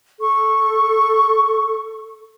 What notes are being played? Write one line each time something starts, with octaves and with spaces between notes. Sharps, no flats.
A4 C#6